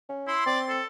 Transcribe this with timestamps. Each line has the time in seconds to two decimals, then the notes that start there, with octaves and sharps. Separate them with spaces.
0.09 C#4
0.28 E4 C6
0.46 C4 D5
0.69 A4